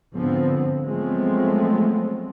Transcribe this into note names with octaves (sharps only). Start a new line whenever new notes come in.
G#2 D3 F3 B3 C4
F3 F#3 G#3 A3 B3 C4